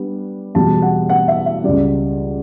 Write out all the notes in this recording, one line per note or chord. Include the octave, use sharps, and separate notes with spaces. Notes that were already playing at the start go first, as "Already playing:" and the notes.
Already playing: G3 B3 D4
E2 B2 G3 A5
F#5
F#5
E5
E5
C#2 C#3 G3 D5